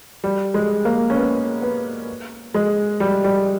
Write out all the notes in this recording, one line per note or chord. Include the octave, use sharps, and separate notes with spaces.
G3
G#3
A#3
C#4
B3
B3
G#3
G3
G3